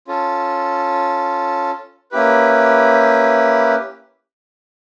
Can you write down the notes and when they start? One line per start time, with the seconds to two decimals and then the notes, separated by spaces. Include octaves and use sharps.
0.08 C#4 F4 A4
2.12 A#3 C#4 E4 G4 B4